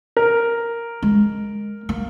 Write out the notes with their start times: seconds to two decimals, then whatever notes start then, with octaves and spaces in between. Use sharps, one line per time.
0.17 A#4
1.03 G#3
1.89 A#3